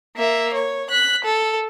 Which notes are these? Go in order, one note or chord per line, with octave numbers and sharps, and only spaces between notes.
A#3 E5
C#5
F#6 B6
A4